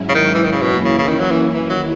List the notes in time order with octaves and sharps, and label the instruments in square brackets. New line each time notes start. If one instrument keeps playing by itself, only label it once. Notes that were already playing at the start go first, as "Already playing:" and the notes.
Already playing: [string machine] G#2 F#3 C#4 E4
[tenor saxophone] C#3
D#3
E3
D#3
C#3
[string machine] F#2 E3 A#3 C#4 E4 [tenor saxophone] B2
[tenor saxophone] C#3
C#3
D#3
F#3
E3
[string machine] D#2 D#3 A#3 E4 [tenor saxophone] E3
[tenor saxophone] F#3